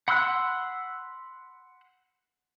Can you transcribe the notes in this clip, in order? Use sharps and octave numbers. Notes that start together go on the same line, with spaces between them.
F#5 B5 C6 E6 F#6